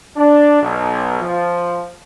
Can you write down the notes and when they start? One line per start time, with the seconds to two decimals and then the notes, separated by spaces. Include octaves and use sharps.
0.16 D4
0.61 B1
1.20 F3